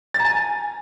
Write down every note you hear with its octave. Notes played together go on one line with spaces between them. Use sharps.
A6
A#5
G#5